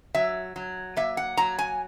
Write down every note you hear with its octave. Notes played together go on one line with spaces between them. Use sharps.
F#3 E5
F#3
A#3 E5
F#5
F#3 A#5
G#5